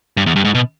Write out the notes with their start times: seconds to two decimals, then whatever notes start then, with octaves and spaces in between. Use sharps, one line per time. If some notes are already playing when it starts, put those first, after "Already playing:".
0.17 G2
0.26 E2
0.36 G2
0.45 G#2
0.55 B2